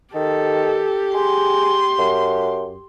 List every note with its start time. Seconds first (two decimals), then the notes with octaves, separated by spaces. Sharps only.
0.15 D#3 G4 A4
1.14 G#4 C6
1.98 F#2